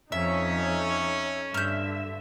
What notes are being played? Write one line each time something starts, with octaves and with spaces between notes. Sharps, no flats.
F2 C#4 D#4 A4 C#5 E5
G2 D3 E5 F6 G6